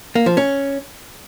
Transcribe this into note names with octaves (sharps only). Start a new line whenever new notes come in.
A#3
F3
C#4